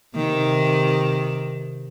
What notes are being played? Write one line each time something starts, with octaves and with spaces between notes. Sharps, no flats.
C3 D#3